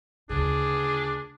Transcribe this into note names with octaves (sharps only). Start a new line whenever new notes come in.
D2 C#3 D4 G#4